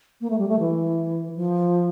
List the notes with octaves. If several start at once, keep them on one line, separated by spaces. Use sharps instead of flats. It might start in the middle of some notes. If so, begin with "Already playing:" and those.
A#3
A3
G3
A3
E3
F3